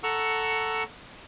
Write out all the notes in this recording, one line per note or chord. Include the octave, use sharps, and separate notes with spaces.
A4 F#5 A#5 C#6 E6